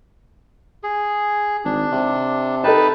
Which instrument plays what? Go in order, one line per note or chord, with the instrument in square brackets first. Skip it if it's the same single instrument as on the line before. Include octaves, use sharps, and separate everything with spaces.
[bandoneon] G#4
[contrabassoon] G#1 [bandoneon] D4
[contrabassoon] C3
[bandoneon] D#4 B4 A5 [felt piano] A4 D#5 G5